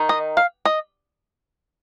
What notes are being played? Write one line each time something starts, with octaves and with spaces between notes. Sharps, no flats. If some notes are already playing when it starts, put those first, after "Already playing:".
Already playing: D#3 D#4
D#5
F5
D#5